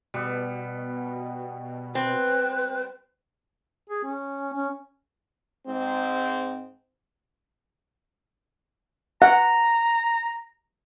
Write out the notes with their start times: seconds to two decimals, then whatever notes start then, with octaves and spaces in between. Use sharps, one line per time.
0.14 B2 G3 B3
1.95 C4 B4
3.89 G#4
4.04 C#4
4.54 C#4
5.67 G#2 C4
9.22 F#5 A#5